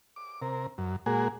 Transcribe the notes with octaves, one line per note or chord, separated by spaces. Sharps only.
D6
C3 A#4
F#2
A#2 G#3 A#3 F#4 G#4